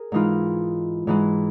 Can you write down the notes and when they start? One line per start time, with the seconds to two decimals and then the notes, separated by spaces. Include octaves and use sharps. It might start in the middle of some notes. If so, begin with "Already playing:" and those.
Already playing: G#4 A#4
0.12 G#2 E3 G#3 D#4 F4
1.07 G#2 E3 G#3